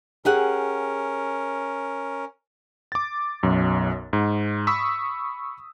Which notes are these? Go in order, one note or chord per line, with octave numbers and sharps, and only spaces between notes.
C#4 G4 G#4 A#4 F#5
D6 A6
B1 F#2
G#2
B5 C#6 D#6 E6 B6